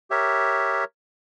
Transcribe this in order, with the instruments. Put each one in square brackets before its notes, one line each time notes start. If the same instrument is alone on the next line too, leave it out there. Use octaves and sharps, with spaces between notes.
[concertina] G4 A#4 C#5 E5